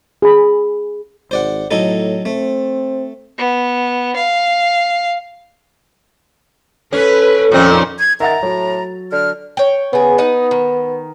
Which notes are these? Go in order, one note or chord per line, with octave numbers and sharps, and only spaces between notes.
G#4 B5
G#1 C5 D5 F#5
A2 F#3 D#4 A4
A3 C4
B3
F5
C#4 A4 B4
F2 A#2 D#3 C4 C#4
G#6
D#3 E5 F#5 A#5 A6
A2 F#3
D3 F6
C#5 G5
C#3 B3 G#4
D#4 D#5 F#5
D#3